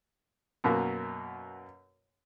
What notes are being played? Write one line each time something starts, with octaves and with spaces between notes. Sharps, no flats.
F#2 B2 A#3